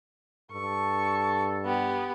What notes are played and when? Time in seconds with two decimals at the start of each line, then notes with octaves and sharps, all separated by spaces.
0.52 G2 A4 C#6
1.65 B3 G4